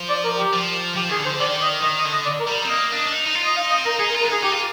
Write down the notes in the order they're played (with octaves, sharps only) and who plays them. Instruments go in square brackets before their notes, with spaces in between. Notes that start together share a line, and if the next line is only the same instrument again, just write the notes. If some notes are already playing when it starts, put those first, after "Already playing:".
Already playing: [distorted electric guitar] F3
[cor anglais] D5
A#4
G4
[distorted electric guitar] F3
[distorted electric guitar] F3 [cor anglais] G4
[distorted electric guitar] D#3 [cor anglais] G#4
[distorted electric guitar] D3
[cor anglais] C5
[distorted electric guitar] D#3 [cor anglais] D5
[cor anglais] D#5
[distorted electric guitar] D#3 [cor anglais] D#5
[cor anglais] D#5
[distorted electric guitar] D3
[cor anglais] D#5
D5
A#4
[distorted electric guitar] G3
C4
[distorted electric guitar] A#3 [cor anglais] D#5
[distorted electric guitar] D4
D4
D#4
D#4
F4
[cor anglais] D#5
[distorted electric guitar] D#4 [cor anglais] F5
[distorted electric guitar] C4 [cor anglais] D#5
[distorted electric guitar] D#4 [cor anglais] A#4
[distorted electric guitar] D#4 [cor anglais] G#4
[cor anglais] A#4
[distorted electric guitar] F4
[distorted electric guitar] D4 [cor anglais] A#4
[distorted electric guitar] D#4 [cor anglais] G#4
[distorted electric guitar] D#4 [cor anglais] G4
[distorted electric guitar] F4